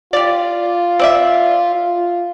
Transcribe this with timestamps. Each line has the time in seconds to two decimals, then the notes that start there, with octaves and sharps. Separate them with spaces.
0.13 F4 G4 D5
0.99 C4 D5 E5
1.75 F4